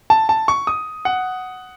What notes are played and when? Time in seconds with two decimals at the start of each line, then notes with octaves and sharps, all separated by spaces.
0.10 A5
0.29 A5
0.48 C#6
0.67 D#6
1.05 F#5